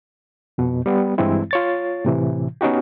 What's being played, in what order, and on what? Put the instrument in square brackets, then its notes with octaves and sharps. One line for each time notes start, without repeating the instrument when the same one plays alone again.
[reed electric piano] F2 B2
G3 B3
G2 E3 G#3 C4 E4
F4 C#5 A6
A2 C3 E3
B3 C#4 D#4 F#4 G4